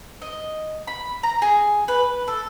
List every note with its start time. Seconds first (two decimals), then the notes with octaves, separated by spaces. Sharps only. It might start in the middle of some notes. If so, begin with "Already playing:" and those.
0.22 D#5
0.87 B5
1.23 A#5
1.42 G#4
1.88 B4
2.28 A4